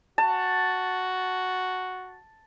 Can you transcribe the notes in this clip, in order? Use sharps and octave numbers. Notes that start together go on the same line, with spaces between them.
F#4 A5